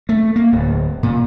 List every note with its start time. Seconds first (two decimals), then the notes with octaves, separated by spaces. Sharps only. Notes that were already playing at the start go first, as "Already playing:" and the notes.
0.09 A3
0.36 A#3
0.52 D1
1.03 A#2